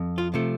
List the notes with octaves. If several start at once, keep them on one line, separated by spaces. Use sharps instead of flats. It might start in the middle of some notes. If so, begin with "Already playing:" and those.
Already playing: F2
F4
C3 F3 A3